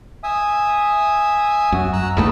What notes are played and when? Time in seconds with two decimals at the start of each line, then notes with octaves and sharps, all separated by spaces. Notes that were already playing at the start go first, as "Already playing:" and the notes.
0.23 E5 G#5 D#6
1.72 F#2 F#4
1.93 A#5 E6 F#6
2.17 A#1 E2 A3 B4 D#5 A5